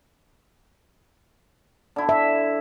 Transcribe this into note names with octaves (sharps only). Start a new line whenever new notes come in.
D3 E4
E5